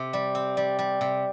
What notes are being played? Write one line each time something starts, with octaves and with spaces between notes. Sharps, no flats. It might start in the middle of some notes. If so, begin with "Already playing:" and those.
Already playing: C3
G3
C4
G3
G3
C3